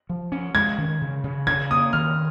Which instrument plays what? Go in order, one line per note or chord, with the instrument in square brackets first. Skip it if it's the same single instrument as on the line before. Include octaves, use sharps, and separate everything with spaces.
[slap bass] F3
C#4
[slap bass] G#3 [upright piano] G#6
[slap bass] D#3
C#3
C#3
[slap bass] C#3 [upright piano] G#6
[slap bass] A#3 [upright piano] D#6
[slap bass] D#3 [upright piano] F6